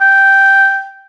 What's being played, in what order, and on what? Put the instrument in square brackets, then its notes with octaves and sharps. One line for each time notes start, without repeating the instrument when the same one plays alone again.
[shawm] G5